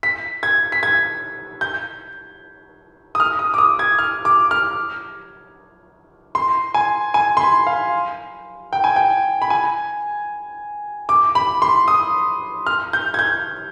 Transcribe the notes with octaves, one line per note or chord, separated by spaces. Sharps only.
B6
G#6
B6
G#6
G6
D#6
F6
D#6
D6
D#6
G#6
F6
D6
F6
C6
G#5
G#5
C6
B5
F5
G5
G#5
G5
B5
G#5
D6
B5
C6
D#6
F6
G6
G#6
G6